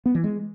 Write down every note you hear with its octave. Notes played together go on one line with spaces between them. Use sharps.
B3
E3
G#3